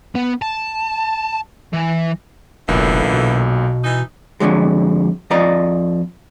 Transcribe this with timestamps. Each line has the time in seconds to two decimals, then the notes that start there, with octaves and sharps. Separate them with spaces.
0.15 B3
0.42 A5
1.73 E3
2.68 F1 B1 A#2 D3 E3 A#3
3.13 B2
3.84 E3 D#4
4.40 F2 G#2 D3 F#3 G#3
5.30 F2 F3 D5 D#5 A#5